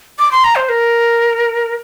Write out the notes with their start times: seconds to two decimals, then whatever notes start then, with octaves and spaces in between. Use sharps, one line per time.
0.19 D6
0.32 C6
0.44 A#5
0.56 C5
0.69 A#4